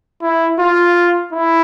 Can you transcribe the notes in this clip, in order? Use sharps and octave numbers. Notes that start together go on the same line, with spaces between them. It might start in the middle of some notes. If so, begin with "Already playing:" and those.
E4
F4
E4